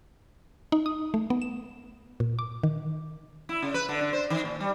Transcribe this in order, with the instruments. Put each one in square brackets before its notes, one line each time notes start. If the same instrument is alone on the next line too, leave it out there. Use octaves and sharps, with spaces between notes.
[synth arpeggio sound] D#4
D#6
A3
B3
E7
A#2
D6
D#3
[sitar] E4
C#3
B4
D3
D3
C5
D#3
A#2
G3